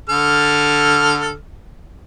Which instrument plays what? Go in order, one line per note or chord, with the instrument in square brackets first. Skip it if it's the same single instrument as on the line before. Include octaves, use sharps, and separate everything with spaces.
[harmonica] D3 A4 F6